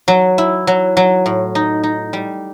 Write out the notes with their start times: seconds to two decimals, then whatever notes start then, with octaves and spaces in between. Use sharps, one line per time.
0.08 F#3
0.38 E4
0.67 F#3
0.97 F#3
1.26 A2
1.55 D#4
1.83 D#4
2.13 G3